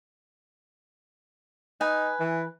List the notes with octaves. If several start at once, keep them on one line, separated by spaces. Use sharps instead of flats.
D#4 B4 G#5
E3